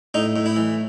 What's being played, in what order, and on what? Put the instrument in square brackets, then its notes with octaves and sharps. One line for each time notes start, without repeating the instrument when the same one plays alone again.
[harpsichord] A2 D#4
A2
E4
E3